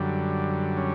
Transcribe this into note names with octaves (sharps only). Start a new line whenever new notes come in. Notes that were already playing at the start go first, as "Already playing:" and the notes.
Already playing: F#2 D3 G3
C#4